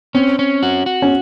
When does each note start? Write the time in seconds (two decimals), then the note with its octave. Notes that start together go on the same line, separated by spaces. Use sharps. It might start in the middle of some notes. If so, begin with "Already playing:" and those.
0.14 C4 C#4
0.39 C#4
0.63 F#4
0.86 F#4
1.02 C#4